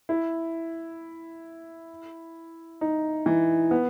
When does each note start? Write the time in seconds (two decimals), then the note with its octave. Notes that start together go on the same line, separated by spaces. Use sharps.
0.09 E4
2.81 D#4
3.26 E3
3.71 B3